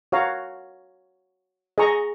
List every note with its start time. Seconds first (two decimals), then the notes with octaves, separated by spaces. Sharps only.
0.12 F#4 C#5 F5 A#5
1.78 G#4 D#5 A#5 C#6